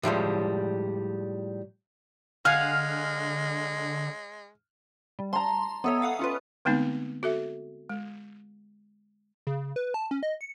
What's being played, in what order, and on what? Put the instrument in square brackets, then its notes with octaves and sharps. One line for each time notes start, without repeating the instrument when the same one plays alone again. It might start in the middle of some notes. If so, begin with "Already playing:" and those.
[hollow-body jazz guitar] A2 F3 G3 G#3
[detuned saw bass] D3 [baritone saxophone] G#3 [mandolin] F5 F#5 G#5 [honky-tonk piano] F6
[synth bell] G3
[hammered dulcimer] A5 A#5 [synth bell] C6
[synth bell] B3 A4 C#5 [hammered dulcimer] D#5 E5
[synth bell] F5 F#5 D#6
C#4 F4 B4
[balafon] D3 G#3 A3 B3 C4 D#4
F#4 A4 E5
G#3
[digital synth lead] C#3
B4
A5
C#4
D#5
C#7